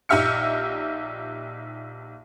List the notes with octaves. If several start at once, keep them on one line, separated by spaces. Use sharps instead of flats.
A#1 D#4 G4 E5 F6 C#7